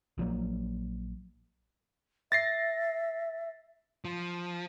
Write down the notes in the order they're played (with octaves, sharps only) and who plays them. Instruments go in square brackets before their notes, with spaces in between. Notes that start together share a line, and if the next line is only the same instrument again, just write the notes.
[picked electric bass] A#1 F3 F#3 A#3
[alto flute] E5 [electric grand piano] A6 A#6 C7
[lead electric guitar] F3